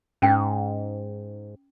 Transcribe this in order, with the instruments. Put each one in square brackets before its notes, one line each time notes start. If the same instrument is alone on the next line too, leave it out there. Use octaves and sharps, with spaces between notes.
[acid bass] G#2 [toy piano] C#4 G5